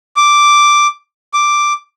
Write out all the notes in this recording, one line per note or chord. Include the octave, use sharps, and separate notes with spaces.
D6
D6